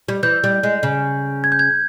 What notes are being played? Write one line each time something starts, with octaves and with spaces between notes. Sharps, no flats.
G3
E3 G6
G3
G#3
C#3
G#6
G6
G#6